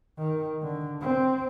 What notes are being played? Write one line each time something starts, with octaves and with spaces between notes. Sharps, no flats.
D#3
D3
C4